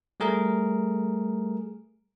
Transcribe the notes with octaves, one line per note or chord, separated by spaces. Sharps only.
G3 A3 G#4 A#4